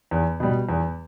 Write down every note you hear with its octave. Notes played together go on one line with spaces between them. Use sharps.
E2
B2 G3
E2